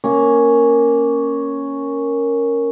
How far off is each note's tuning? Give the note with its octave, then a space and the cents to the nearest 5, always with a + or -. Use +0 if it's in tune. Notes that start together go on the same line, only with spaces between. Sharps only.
A#3 +0 C#4 +0